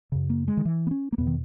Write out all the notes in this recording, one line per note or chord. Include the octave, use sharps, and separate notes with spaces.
F#2 C#3
A#3
G#3
D#3
E3
B3
C#4
A#3
E2 B2 B3
D#3